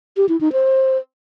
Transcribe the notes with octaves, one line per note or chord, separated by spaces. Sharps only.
G4
E4
D#4
C5